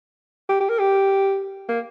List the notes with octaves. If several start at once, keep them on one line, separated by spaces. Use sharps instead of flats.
G4
G4
A#4
G4
A#3